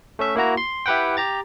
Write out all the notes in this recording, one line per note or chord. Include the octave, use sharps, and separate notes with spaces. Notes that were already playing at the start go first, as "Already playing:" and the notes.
A3 C#4 E5
A#3 E4 F#4 A#5
C6
E4 G4 B4 F#5 G5
G4 A#5 A6